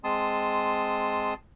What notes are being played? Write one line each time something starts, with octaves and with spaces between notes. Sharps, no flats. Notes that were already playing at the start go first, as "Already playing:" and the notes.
G#3 C4 A5 C6 D#6